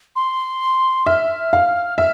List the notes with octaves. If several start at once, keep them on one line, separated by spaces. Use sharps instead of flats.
C6
E5 F6
F5
E5 F6